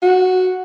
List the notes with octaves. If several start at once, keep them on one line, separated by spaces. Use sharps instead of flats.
F#4